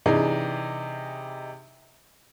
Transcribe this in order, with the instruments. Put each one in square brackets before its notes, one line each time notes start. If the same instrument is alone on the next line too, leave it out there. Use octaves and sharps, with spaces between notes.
[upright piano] C3 E3 D4 D#4 G4 G#4